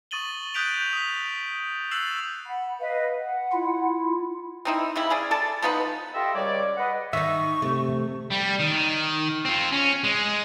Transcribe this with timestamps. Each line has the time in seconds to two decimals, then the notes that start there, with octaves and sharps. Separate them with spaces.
0.11 C#6 D#6 A6 D#7 F#7 G7
0.54 D#6 F#6 G6 B6 D7 F7
0.93 D#6 F#6 B6
1.91 E6 F#6 A6 C7 E7 F#7
2.45 F#5 B5
2.79 B4 D#5 F5
3.19 F#5
3.52 E4 F4
4.65 C4 D#4 E4
4.96 C#3 G3 E4 B5
5.10 C#4 G#4 D5
5.31 A4 D5 A5
5.62 F3 B3 D#4 B4
6.14 F4 G4 A4 D#5 E5 G5
6.35 C#2 G3 C#5 D5
6.77 B4 D#5 F#5
7.13 D#3 D#4 E5 C#6
7.62 C3 A3
8.31 G3
8.60 D#3
9.45 F3 C4
9.72 C#4
10.04 G#3